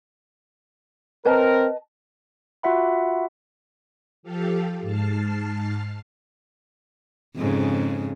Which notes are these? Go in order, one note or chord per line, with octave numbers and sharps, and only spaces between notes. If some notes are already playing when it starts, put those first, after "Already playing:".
C4 A#4 B4 D#5 A5
F4 F#4 E5 F#5 B5
F3 G4 A4 F5
G#2 A5 F6 C7
F2 G#2 C#3